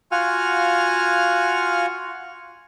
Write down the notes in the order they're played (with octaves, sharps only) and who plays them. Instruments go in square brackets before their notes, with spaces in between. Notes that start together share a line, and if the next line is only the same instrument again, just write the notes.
[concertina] F4 F#4 F5 F#5 G#5 F6